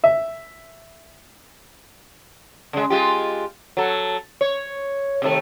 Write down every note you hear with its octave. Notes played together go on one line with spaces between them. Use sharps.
E5
C#3 G#3
G#3 F4 G4
F#3 A4
C#5
C3 D#3 A3